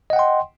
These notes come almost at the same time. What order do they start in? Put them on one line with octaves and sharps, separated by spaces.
D#5 F#5 G5 C6